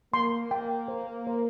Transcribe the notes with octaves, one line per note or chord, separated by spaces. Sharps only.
A#3 C6
G5
C5
C5